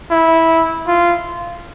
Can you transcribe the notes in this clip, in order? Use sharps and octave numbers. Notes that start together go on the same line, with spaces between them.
E4
F4